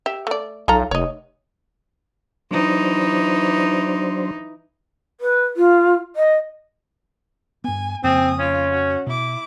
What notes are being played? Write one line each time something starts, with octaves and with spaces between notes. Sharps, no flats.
G4 E5
A3 D5
B1 F4 A4 A#5
F1 C#5 D#5
E3 F#3 D4 D#4 C5
B4
F4
D#5
G2 B3 G#5
F2 C#3 A#3 C4 G#5 D#6
C#4 F4
F#4
B2 E4 D6